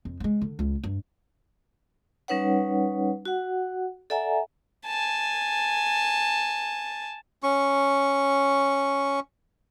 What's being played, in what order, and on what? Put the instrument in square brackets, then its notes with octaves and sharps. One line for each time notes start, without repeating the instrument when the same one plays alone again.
[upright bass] F2
G#3 B3
D3
C#2
G2
[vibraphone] G3 C#4 D#4 B4 C#5 F#5
F#4 F#5
A4 D5 E5 F#5 G#5 A#5
[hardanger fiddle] G#5 A5
[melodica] C#4 C#6